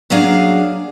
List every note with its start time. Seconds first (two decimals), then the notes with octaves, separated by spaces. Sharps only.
0.10 F#2 F#3 A#3 D4 G#4 F5